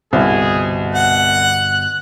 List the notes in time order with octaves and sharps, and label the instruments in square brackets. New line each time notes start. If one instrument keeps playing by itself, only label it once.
[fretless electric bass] G1 B2 C4 [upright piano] C2 [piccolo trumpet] G#4
[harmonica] F#5 [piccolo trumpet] F#6